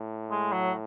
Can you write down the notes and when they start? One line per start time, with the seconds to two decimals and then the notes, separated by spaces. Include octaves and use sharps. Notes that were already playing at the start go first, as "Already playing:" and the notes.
Already playing: A2
0.31 G#3
0.52 F#3